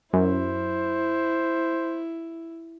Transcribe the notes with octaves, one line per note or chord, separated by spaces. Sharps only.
F#2 E4 C5